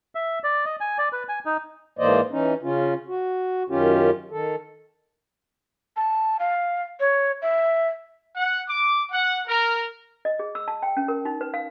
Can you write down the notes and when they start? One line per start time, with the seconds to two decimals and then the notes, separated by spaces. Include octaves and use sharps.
0.15 E5
0.44 D5
0.65 D#5
0.81 G#5
0.98 D5
1.13 B4
1.29 G#5
1.45 D#4
1.99 G#2 E3 A#3 C5 D5 D#5
2.31 E3 C#4 D#4
2.62 C#3 C#4 F4
3.07 F#4
3.69 F#2 D#3 C#4 F4 G4
4.31 D#3 A4
5.97 A5
6.39 F5
7.00 C#5
7.42 E5
8.36 F#5
8.68 D6
9.11 F#5
9.46 A#4
10.25 D#5
10.39 G#4
10.55 E6
10.68 A5
10.83 G5
10.97 C#4
11.08 A#4
11.25 D#4
11.41 B4
11.54 F5